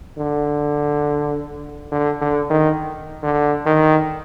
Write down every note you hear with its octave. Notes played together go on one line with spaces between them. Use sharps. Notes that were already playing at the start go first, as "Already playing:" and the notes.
D3
D3
D3
D#3
D3
D#3